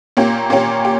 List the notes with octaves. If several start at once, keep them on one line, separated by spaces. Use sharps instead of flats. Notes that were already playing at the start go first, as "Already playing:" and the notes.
A#2 A#3 C#4 G4
A#2 A#3 C#4 G4
G4